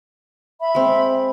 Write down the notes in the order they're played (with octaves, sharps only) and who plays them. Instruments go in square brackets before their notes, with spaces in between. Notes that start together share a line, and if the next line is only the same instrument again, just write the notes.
[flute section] E5 B5
[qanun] G#3 C4